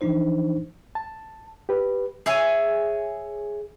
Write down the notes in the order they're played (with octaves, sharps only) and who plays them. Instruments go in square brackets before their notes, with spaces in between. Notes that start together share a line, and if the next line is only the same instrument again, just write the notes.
[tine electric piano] E3 F3 D4 D#4 C5
[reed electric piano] A5
G4 B4
[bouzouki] G#4 C#5 E5 G#5